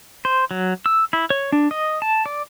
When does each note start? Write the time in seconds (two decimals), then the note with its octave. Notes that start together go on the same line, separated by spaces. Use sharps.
0.25 C5
0.51 F#3
0.86 E6
1.13 E4
1.30 C#5
1.52 D4
1.71 D#5
2.02 A5
2.26 D5